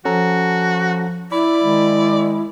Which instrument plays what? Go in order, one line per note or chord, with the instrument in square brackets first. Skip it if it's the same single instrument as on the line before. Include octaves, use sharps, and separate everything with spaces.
[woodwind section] F3 [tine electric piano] C#4 A4 A#5 [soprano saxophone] F#4
[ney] E4 [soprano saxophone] D5 [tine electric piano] B5
[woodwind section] D#3 G#3